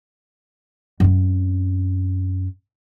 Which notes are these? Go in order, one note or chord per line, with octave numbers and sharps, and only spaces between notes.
F#2 C4